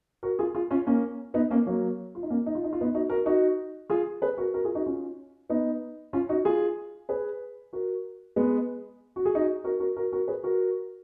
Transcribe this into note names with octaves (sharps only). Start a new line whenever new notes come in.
F#4 A#4
F4 G#4
F4 G#4
C#4 F4
A#3 C#4
B3 D#4
A#3 C#4
F#3 A#3
F4
D#4
A#3 C#4
D#4
F4
D#4
F4
B3 D#4
D#4 F#4
F#4 A#4
D#4 F#4
F4 G#4
G#4 B4
F#4 A#4
F#4 A#4
F4 G#4
D#4 F#4
C#4 F4
B3 D#4
C#4 F4
D#4 F#4
F4 G#4
G#4 B4
F#4 A#4
G#3 B3
F#4
G#4
D#4 F#4
F#4 A#4
F#4 A#4
F#4 A#4
F#4 A#4
G#4 B4
F#4 A#4